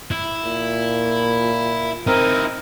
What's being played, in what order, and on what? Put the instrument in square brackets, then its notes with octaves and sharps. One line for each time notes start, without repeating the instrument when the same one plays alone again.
[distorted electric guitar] E4
[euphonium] A#2
[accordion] C4 A#4 [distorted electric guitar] D#4 E4